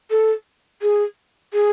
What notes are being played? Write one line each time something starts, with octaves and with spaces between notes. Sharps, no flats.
A4
G#4
G#4